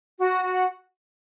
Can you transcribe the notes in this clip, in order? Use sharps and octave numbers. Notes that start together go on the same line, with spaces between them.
F#4
F#4
F#5